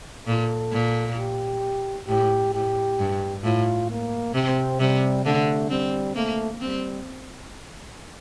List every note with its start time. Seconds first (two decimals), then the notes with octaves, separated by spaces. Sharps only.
0.27 A#2 A4
0.72 A#2
1.18 G4
2.08 A2 G4
2.53 A2 G4
2.99 G2
3.44 A2 F4
3.90 A#3
4.34 C3 C4
4.80 C3 G3
5.25 D3 A3
5.70 G3 C4
6.15 A3 A#3
6.61 G3 C4